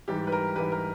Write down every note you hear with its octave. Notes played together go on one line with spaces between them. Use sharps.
G#2 E3 G3 G4
B4
A#4
G#2 E3 G3 B4
A#4